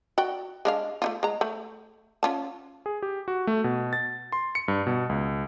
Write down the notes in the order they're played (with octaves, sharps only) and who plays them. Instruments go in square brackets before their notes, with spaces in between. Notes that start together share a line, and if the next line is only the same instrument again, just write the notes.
[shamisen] F#4 D5 G5
G#3 D4 F5
A3 D#4 F4
G#3 A#5
A3
C#4 F4 A5
[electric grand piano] G#4
G4
F#4
A3
B2
A6
C6
C#7
G2
B2
C#2